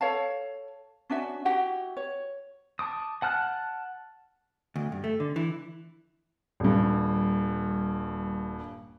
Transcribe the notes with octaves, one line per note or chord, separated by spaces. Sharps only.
A4 C#5 F5 A5
C#4 D4 F#4 E5
E4 F#4 G4 F#5
C#5
A5 D6 D#6
F#5 A5 F6 F#6
D2
G2
A3
D3
E3
D#1 G2